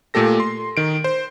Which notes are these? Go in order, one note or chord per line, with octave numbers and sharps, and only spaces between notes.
A#2 A3 G4 A4 A#6
C6
D#3 D7
C5